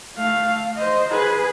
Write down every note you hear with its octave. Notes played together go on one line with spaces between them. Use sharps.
A3 F5
C5 D#5
G#4 B4